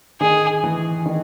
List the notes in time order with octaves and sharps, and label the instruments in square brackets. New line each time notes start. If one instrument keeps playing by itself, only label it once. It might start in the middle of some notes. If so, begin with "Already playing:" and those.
[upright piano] D#3 [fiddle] G#4
[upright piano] E3
D#3